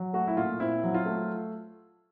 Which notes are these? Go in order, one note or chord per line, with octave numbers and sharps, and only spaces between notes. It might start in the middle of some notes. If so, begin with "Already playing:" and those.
Already playing: F#3
A3 F#4
E4
A#2 F4
C4 E4
F#3
F4
A3